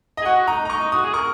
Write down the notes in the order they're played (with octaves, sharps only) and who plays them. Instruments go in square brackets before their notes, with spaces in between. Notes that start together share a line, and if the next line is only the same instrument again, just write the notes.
[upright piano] D#5
[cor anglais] G#4
[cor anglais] F#4 [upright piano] F#5
[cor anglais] D#4 [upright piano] A#5
[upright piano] A#5
[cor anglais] D#4 [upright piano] C#6
[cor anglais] F#4 [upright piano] D#6
[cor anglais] G#4
[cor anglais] A#4 [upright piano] C#6